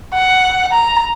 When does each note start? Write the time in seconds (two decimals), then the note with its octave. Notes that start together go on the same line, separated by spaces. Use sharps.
0.14 F#5
0.72 A#5